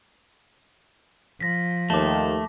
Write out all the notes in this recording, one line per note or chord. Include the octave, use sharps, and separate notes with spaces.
F3 A#6 B6
D#2 A3 A5 D6